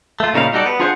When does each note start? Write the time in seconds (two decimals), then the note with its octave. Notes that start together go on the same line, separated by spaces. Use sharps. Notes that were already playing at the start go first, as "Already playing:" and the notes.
0.20 A3 F4
0.34 A#2 C#3 D#4 E4 B4 F5
0.53 G3 D#4 F#4 A4 D5
0.66 B3
0.80 D4 F4 G#4 C5 D#5 F#5